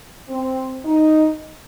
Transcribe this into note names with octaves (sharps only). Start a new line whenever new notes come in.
C4
D#4